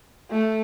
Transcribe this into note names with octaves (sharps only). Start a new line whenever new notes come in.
A3